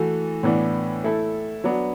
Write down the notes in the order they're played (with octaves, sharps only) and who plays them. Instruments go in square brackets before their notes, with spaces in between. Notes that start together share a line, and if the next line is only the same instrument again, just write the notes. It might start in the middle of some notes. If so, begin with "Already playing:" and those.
Already playing: [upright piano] E3 A3 F#4 A4
A2 E3 B3 D4
A3 E4 A4
F#3 B3 D4